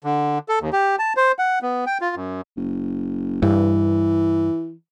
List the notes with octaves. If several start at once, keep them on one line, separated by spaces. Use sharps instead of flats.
D3
A4
D#2
G4
A5
C5
F#5
B3
G5
F4
F#2
F#1
G2 E3